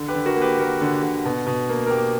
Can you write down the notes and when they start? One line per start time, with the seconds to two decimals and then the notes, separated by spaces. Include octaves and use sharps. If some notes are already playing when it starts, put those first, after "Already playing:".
Already playing: D3
0.08 G4 B4
0.15 D3
0.26 F#4 A#4
0.36 A#3
0.41 G4 B4
0.58 A#3 F#4 A#4
0.81 D3
1.03 D3
1.25 B2
1.47 B2
1.69 A#3
1.86 A#4
1.90 A#3 G4